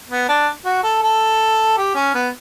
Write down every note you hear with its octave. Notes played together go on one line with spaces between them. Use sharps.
B3
D4
F#4
A4
A4
G4
C#4
B3